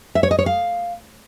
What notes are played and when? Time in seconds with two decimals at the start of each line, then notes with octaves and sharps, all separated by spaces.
0.15 E5
0.23 C#5
0.31 D#5
0.39 C#5
0.46 F5